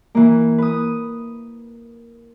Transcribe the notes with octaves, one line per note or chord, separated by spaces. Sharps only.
E3 A#3
B4 D#6